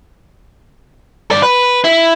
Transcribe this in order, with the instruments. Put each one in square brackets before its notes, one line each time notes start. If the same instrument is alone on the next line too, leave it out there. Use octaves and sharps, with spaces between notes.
[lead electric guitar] G2 D5
B4
E4